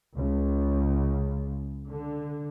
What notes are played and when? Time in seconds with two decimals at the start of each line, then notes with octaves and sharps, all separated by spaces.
0.14 C#2
1.88 D3